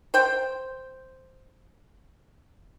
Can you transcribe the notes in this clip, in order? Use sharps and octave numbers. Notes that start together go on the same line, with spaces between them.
C5 G5